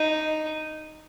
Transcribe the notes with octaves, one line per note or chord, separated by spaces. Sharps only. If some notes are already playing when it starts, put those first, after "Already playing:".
Already playing: D#4